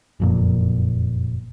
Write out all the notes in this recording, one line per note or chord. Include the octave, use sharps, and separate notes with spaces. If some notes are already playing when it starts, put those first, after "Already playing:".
F#1 F2 A#2